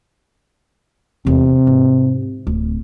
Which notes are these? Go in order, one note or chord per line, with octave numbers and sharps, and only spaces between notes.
E2 C3 C4
G#2
D1